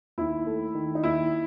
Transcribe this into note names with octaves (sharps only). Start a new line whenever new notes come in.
D#2 E4
A3
D#3
D#4
D#2 E4